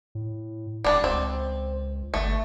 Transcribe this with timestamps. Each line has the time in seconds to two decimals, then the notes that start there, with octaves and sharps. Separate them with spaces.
0.15 A2
0.84 D#1 G3 D4
1.04 C#2 C4
2.14 G1 A3